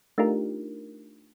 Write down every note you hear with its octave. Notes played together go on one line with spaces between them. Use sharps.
A3 D4 D#4 F4 G4 A#4